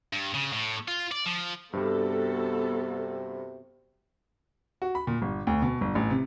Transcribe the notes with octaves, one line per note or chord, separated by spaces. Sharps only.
G2
C#3
A2
F4
D5
F3
G2 C3 G3 B3 F#4 A4
F#4
B5
A#2
G1
D2
B2
G1
A1
C3